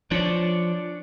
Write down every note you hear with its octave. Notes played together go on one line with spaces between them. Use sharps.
F3 D4 C#5 D5